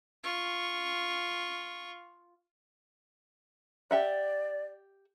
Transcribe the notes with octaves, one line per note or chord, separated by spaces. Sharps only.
F4 C#6
G4 D5 E5 F#5